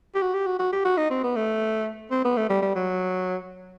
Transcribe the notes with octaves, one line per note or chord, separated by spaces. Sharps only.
G4
F#4
G4
F#4
F#4
G4
F#4
D#4
C4
B3
A3
C4
B3
A3
G3
G3
F#3